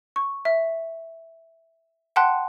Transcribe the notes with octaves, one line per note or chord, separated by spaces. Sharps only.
C#6
E5
F#5 G5 A5 C6 F#6